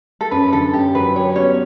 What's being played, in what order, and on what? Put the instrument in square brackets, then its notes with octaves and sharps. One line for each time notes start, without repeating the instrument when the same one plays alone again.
[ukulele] A4
[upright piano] F#2 [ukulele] B4
[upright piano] D3 [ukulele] A4
[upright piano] F#2 [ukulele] G4
[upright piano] F#3 [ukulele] B4
[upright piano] G4 [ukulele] C#5
[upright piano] B3 [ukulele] C#4 C#5